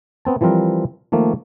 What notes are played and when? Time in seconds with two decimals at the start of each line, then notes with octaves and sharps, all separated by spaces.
0.25 B3 C4 A5
0.41 E3 F3 G3 C4 A#4
1.12 D#3 F3 A3 A#3